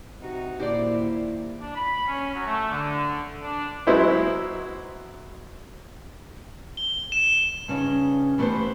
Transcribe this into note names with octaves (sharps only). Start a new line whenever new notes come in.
C3 D#4 F#4
D#2 A#2 E4 G4 C5 D5
D4
B5
C#4
F#3
A3
D3
D4
F#3 G#3 B3 E4 C5
G7
E7
G2 C#3 C#4 D#4
E3 A3 B3 G4 B4 C5